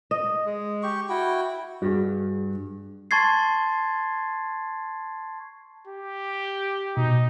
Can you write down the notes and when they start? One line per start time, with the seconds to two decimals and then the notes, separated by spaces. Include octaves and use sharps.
0.11 D#5
0.45 G#3
0.83 G4 C#6
1.09 E4 F#4 G5
1.82 G2 F#4 G#4
3.11 A5 C6 C#6 G#6 A6 C7
5.87 G4
6.97 B2 D#4